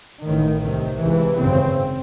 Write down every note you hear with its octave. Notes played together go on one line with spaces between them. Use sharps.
A1 A2 D#3
C2 C3 D#3
C#2 C3 E3
G#1 F#2 C#3 C4